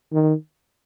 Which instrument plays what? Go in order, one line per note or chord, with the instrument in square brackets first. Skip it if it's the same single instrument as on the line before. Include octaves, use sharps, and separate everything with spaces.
[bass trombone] D#3